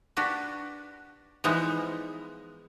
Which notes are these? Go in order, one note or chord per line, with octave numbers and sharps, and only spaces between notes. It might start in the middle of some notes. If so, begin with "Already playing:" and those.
D4 F#4 G4 B4
E3 F3 G3 G#3 B3 D#4